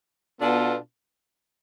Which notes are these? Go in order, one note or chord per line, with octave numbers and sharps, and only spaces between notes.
B2 B3 D4 F4 A4